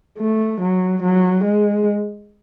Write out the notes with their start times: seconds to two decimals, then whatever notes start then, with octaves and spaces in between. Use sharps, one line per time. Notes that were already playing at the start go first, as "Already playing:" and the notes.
0.18 A3
0.61 F#3
1.03 F#3
1.44 G#3